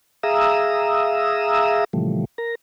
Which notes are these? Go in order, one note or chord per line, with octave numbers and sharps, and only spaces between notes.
G#4 E5 F5 A#5 D#6 E6
A#2 C#3 E3 F3 G3 A3
A#4 A#5